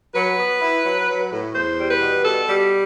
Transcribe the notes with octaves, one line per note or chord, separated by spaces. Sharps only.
F#3 B4
B3
E4
F#3
F#3
A2
E2 C5
G3
B4
B2
B2 A4
G3